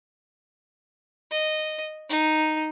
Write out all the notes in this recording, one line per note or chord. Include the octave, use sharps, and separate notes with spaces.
D#5
D#4